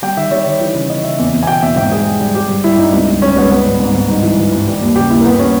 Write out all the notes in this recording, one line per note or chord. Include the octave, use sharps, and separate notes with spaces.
G3 G5
D#3 E5
G3 C#5
D#3
E3
C#3
C#3 D#5
C#3 E5
E2
E2
G#5
B2 G5
E2 E5
G#2 G5
G3 G#4
G3
G3
G3 G4
G2
G3 E4
G2 D#4
C#2
C#2
G3 C#4
C#2 B3
G3 B3
G#2
G#2
G#2
G2 D#4
E3
E3
G2
G3
D#2
C#3 G4
D#2 E4
A#3
G2 B3
C#4